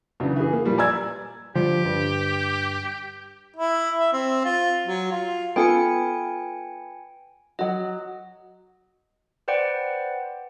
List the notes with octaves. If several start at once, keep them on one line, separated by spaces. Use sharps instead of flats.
C#3 E3 F#3 D4
E3 G#4
A#3
A#2 F3 G3
D5 G#5 A#5 E6 G#6
D3 F3 G3 G4
G2
E4
E5
C4
F4
F#3
F4
B3 F4 A4 G5 G#5 C#7
F#3 F#4 D#5
B4 C5 D5 F#5 G5